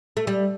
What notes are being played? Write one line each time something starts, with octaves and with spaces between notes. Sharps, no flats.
A3
G3